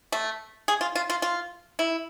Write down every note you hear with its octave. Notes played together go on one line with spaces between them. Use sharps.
A3
G#4
F4
F4
F4
F4
E4